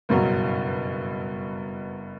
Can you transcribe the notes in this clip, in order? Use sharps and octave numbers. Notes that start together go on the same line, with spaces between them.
F#1 G2 B2 F#3